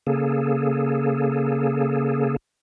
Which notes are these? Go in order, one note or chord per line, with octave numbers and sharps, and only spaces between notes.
C#3 A#3 G#4 A4